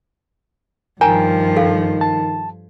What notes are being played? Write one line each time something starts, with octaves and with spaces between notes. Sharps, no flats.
G2 D#3 F3 A#4 G5 G#5 A#5
A4 F5
A5